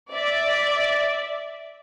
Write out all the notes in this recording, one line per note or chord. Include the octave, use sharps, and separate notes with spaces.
D5 E5